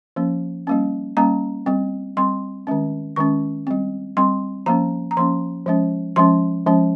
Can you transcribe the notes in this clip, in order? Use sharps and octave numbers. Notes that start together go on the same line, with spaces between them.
F3 A#3 C#4
G3 A#3 C#4
G3 A#3 C#4 A#5
G3 C4
G3 C4 C6
D#3 G#3 C#4
D#3 G#3 C#4 C#6
G3 C4
G3 C4 C6
F3 A#3 C#4 A#5
A#5
F3 A#3 C#4 C6
F3 G#3 C#4
F3 G#3 C#4 C6
F3 G#3 C#4